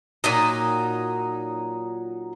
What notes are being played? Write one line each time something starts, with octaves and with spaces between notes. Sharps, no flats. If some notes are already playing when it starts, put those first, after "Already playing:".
A#2 F#3 D#4